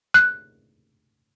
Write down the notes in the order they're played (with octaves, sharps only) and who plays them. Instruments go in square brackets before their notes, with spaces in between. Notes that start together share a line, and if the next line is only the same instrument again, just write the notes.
[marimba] F#6